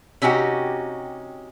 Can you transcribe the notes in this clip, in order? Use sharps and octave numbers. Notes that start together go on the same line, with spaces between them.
C3 C#4 D#4 F#4 G4